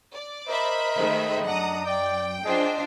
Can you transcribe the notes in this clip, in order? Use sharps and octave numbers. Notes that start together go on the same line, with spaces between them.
D5
A#4 C5 D#5 E5 B5
D#3 G#3 A3
F#2 D4 F#5 A#5 D#6
D5 G5
D4 F4 G#4 C5 D#5